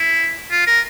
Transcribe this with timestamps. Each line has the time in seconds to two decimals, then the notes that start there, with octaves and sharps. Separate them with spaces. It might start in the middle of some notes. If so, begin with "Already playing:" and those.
Already playing: E4
0.52 F4
0.67 A#4